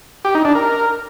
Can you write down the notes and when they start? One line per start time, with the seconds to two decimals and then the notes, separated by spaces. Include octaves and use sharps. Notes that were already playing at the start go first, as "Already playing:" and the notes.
0.25 G4
0.35 D#4
0.45 D4
0.55 A#4